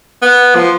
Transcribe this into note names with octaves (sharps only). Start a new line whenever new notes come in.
B3
F3